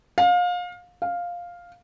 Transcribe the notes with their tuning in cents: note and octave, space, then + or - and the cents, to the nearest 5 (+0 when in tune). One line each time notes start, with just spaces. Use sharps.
F5 +30
F5 +5